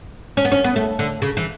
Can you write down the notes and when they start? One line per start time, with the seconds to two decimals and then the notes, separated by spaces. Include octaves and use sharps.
0.37 C#4
0.45 B3
0.52 C#4
0.64 B3
0.76 A3
0.99 D3
1.22 C#3
1.37 E3